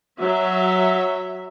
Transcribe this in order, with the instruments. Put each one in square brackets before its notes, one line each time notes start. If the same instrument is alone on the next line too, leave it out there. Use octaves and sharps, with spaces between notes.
[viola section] F#3 E5